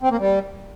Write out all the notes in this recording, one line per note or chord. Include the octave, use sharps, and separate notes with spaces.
C4
A#3
G3